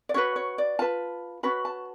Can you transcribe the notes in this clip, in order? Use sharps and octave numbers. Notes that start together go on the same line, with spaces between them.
D5
C#4 F#4 B4 C#5
C#5
D5
F4 B4 A5
C#4 F#4 B4 B5
A5